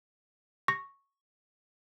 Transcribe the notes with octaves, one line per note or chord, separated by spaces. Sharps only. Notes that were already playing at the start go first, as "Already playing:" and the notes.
C#6 A#6